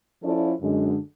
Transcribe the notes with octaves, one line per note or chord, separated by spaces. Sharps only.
F3 C#4 E4 F4 A4 D5
F#2 D3 G#3